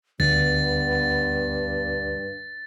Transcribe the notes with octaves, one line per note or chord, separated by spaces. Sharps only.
D2 G2 B3 A6